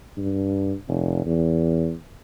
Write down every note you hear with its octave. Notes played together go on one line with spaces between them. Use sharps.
G2
F1
E2